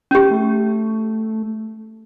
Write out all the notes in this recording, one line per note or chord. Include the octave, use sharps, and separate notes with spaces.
C#4 G4
A3